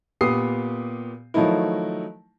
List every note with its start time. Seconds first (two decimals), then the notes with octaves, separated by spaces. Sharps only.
0.21 A#2 B3 G4 D#6 C7
1.34 D#3 F3 F#3 A3 D#4 E4